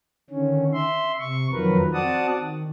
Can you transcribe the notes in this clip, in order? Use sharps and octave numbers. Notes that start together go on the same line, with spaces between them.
D3 D#3 C#4
E5 C6
C3 C#6
F2 D#3 F3 F#3 A#4 B4
C4 F#4 D5 F#5 A5 D#6
D#3